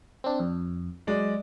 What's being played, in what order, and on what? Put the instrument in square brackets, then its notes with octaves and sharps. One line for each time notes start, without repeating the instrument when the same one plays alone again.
[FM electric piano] C4 D4
F2
[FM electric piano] F#3 [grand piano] G#3 D5